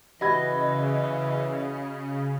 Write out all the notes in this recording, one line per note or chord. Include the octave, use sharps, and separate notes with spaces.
C#3 E3 F#4 D#5 B5 G#6